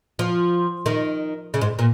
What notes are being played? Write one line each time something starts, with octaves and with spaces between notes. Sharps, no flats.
F3
D#3
C#3
G#2
A#2